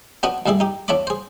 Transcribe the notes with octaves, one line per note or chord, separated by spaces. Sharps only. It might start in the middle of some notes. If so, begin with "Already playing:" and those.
B3 D4 F#4 D#5 F#5
D2 G2 G3 E4 G#4
D#4 G4
E2 D4 C#5 D5 B5 D6
G#4 C5